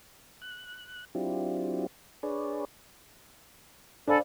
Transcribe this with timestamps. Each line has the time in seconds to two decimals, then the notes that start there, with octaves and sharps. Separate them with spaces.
0.42 F#6
1.15 F#3 C4 D4 E4 F4 G4
2.23 D4 G#4 B4 C#5 D5
4.08 D4 A4 C5 D5 F5 G#5 B5